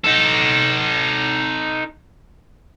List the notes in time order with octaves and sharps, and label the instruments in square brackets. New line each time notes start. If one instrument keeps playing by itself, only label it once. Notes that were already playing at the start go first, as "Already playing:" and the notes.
[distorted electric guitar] D#4 A4